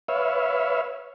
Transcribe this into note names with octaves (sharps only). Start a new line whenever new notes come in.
B4 C#5 E5 F5